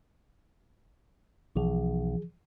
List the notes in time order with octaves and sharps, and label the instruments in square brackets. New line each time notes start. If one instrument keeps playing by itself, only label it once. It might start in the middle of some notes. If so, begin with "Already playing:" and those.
[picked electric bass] B1 [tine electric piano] E3 F3 G#4